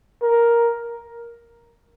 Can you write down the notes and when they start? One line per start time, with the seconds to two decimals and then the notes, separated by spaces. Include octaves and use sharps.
0.22 A#4